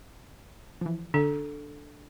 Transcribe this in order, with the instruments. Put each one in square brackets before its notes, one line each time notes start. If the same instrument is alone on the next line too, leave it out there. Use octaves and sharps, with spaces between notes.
[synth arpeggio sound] E3 F3
[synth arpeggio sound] D3 [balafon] D4 A4